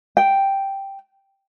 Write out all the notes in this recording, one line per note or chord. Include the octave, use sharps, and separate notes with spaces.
G5